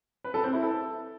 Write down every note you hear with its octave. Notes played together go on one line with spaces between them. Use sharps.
B4
A4
C4
E4
A4